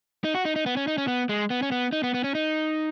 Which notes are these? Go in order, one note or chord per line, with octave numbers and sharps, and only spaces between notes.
D#4
F#4
D#4
D#4
B3
C#4
D#4
C#4
B3
G#3
B3
C#4
B3
D#4
B3
B3
C#4
D#4